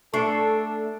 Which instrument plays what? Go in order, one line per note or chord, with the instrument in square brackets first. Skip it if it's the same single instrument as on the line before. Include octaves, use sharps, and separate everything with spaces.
[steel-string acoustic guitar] A3 [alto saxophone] D4 [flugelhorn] A4 [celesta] C#6 C7